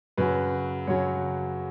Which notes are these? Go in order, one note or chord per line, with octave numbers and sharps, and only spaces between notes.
F#2 C#3 F#3 B4
F#2 C#3 F#3 C#5